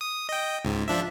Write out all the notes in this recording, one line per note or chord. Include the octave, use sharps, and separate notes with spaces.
D#6
D#5 G5
C#2 G#2
F3 D4 E5